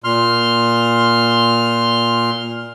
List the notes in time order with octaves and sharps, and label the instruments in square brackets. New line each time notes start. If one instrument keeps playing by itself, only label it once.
[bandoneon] A#2 C6 F6